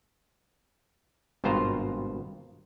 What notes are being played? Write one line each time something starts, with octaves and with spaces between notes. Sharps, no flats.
G#1 G2 B2 F4 C5 A#5